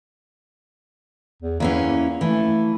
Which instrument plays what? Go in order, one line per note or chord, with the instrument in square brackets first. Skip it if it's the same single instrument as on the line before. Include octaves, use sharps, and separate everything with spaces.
[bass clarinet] E2
[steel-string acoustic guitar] E2 E3 C#4 [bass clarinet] A#3
[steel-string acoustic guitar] E3 [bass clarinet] A3